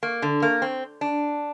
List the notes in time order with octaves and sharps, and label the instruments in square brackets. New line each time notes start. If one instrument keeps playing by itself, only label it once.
[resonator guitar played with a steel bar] A#3
D3
A#3
C4
D4